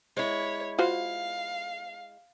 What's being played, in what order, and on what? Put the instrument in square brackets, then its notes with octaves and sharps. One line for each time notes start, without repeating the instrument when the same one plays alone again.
[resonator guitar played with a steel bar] G#3 E4 [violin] C#5
[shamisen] F4 F#4 C5 [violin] F5